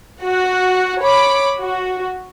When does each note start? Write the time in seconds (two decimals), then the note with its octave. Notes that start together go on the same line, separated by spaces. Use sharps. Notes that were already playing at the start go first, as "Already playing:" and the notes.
0.23 F#4 F#5
1.01 C#5 B5 D6
1.60 F#4